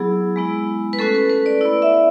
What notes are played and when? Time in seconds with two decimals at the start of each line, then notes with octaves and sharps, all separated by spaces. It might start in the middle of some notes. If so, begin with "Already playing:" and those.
Already playing: F#3 B3 E4 G#4
0.36 G#3 B3 E4
0.93 B4
0.99 A3 C#4 F#4 A4
1.15 B4
1.30 B4
1.46 D5
1.61 E4 D5
1.65 B3
1.82 E5